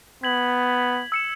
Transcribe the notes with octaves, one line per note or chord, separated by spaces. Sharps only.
B3 G#6 B6 F#7
E6 C#7 E7